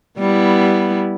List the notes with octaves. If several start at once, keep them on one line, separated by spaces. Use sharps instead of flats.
G3 B3 E4